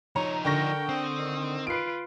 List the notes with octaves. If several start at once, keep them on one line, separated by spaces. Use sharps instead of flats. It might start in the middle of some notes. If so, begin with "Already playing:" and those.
F3 D#4 C#5 A#5
D3 A#4 G5 C#6 A#6
C4 D#6
D#3
F4 B4 C7 D7